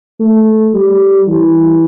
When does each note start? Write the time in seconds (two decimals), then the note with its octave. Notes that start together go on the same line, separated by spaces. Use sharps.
0.20 A3
0.74 G3
1.28 E3